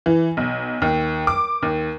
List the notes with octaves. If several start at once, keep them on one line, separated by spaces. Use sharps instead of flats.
E3
B1
D#2
D6
D#2